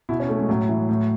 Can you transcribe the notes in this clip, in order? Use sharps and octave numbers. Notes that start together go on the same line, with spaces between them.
B2 E4
C#4
A3
G#3
A2 F#3
E3
A2